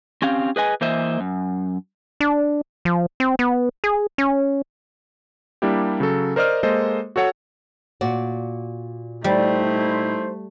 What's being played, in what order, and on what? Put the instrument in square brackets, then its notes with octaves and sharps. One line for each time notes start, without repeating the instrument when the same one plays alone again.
[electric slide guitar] C4 C#4 G4 F5
G#4 B4 D#5 G#5
E3 A#3 C5 D#5 E5
F#2
[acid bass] D4
F3
C4
B3
G#4
C#4
[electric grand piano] G3 A#3 D4 E4 G4
C#3 F#3 A4
A#4 C5 D5 D#5 F6
G#3 A#3 A4 C5 D#5
F#4 A4 C#5 F#5
[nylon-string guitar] A#2 F#4 D5
[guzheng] G3 [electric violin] A3 [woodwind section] D#4 E4 C5